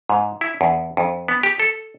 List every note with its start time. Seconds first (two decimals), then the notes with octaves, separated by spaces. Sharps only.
0.09 G#2
0.41 E4
0.61 E2
0.97 F2
1.28 B3
1.43 G4
1.60 A4